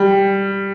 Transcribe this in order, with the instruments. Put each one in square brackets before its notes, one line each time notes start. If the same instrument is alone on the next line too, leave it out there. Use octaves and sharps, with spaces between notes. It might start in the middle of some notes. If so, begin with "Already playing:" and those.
Already playing: [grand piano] G3